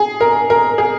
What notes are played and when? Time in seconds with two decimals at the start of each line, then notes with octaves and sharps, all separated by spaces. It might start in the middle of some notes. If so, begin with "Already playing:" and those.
Already playing: G#4
0.21 A#4
0.50 A#4
0.78 G#4